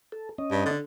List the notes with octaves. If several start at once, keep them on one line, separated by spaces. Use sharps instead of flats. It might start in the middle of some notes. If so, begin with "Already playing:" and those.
A4
C#4 D#5
G2
D3